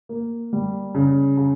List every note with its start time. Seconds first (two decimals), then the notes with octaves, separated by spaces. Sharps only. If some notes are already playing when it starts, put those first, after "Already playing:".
0.09 A#3
0.53 G3
0.95 C#3
1.37 C#3